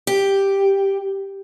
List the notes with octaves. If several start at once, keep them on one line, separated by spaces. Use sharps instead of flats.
G4